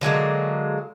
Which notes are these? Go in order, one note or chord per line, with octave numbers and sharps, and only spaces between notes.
D3 F#3 G#3 A#3